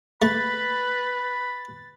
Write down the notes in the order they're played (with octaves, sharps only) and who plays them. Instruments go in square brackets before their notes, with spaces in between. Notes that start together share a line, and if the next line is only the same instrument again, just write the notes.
[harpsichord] A3 [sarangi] B4 [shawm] B5 [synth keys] A6